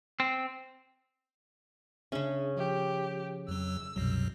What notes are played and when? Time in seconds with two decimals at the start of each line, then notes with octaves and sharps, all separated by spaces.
0.20 C4
2.12 C#3 C#4 D4 G#4 E5
2.57 F3 G4
3.48 F2 F#3 E6
3.96 C2 F#2 B2 F#3